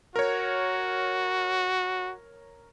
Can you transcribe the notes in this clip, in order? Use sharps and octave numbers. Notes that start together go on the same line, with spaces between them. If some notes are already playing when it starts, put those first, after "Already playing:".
F#4 A#4 C#5